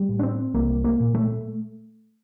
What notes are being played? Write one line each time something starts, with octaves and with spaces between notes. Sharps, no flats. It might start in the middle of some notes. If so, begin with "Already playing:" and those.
Already playing: G3
A2
D4
C4
C2 A#3
A#3
A#2
A3